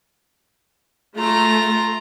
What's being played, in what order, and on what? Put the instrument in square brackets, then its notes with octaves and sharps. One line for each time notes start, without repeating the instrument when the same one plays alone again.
[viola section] A3 [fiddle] F4 A#5